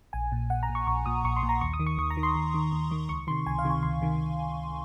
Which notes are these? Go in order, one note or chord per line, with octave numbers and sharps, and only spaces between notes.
A#1 G#5
A#2
A#1 F#5
A#5
A#2
C#6
A#1 C#6
A#2 D#6
A#1 C#6
C6
A#2
A#5
D#2 C#6
D#6
D#3
C#6
D#2 C#6
A#5
D#3
C6
D#2
D#3
D#2
D#3
C#2 C#6
C3 D#3 C6
C#2 G#5
F5
C3 D#3
G#5
C#2 C6
C3 D#3